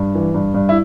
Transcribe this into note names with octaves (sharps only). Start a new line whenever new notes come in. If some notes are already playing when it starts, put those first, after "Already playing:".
Already playing: G2
E3
G2
G2
E4